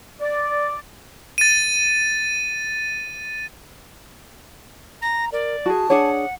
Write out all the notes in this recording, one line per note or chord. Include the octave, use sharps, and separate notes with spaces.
D5
A6 D#7
A#5 A#6
A#4 D5
F#4 G#4 A5
D4 G#4 C#5 F#5